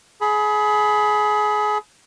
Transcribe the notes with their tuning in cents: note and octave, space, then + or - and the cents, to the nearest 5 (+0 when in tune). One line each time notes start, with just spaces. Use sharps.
G#4 +25 B5 +0